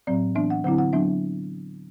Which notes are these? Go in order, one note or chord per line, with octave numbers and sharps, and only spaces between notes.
A2 F#3 C4 D5
E3 B3 D4 E5
F#5
D3 F#3 C4 E4 F#5
F#5
F#3 B3 D4 E5